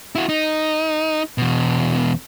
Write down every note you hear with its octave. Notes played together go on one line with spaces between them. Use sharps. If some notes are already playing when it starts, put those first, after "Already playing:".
E4 F#4
D#4
E2 B2